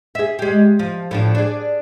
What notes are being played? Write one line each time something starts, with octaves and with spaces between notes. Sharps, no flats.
G#4 E5
G#3 G4
F3
A2 F3 D4
D4 G#4